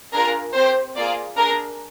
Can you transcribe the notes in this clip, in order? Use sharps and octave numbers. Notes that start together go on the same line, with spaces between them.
D4 F4 G#4 A#4
C4 G4 C5
A#3 F4 G#4 D5
D4 G#4 A#4